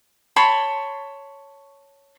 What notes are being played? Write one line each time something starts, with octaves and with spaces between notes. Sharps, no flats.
C#5 A5 B5 C6